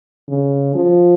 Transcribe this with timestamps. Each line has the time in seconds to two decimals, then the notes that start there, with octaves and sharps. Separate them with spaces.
0.29 C#3
0.75 F3